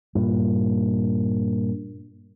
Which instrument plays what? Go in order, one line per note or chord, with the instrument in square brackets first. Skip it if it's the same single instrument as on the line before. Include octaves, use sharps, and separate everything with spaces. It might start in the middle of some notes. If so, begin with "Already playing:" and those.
[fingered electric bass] G2 A#2